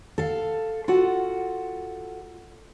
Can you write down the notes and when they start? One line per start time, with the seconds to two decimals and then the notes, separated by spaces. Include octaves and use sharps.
0.18 A4 F5
0.88 F4 F#4 A4 F#5